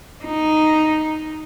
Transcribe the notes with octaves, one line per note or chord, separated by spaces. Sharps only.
D#4